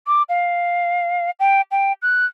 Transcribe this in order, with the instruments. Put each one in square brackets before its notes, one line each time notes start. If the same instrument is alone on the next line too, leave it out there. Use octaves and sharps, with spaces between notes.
[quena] D6
F5
G5
G5
F#6